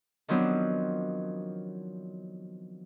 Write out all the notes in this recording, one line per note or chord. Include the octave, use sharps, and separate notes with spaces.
D#3 F3 F#3 B3 C4 D4